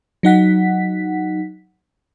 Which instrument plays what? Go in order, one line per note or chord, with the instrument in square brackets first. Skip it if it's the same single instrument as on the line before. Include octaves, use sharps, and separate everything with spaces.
[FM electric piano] F#3 D#4 F#5 B6